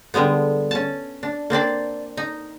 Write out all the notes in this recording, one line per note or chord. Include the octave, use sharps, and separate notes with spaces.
D3 G3 G#3 B3
C#4 A5
D4
A#3 C4 D4 D5
D#4